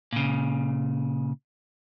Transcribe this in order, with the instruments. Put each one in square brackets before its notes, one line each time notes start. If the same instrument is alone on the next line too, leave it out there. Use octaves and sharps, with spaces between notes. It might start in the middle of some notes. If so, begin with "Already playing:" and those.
[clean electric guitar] A#2 C#3